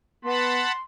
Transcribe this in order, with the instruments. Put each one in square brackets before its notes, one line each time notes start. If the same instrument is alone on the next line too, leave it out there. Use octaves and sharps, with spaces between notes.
[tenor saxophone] B3 [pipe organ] F#5 A5 B5 [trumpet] C6